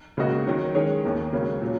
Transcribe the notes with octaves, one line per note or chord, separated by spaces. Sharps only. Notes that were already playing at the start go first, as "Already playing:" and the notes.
C#2 C#3 A#3 F#4 D#5
D#3 F#3 D#4
D#3 G#3 C#4 G#4 C#5
D#2 D#3 A#3
C#2 C#3 F#3 A#3 C#4
A#2 F#3